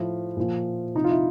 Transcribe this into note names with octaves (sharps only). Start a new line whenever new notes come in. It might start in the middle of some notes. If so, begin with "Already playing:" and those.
Already playing: A2 F3
A#2 F3
C3 F3 D#4
F4
E4